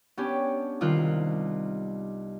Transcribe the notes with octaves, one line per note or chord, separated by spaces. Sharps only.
B3 C#4 D4 G4
C2 D#3 F4 F#6